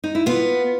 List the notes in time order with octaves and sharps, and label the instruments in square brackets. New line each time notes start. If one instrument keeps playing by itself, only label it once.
[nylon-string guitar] D#4
E4
[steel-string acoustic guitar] B3 [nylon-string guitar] F4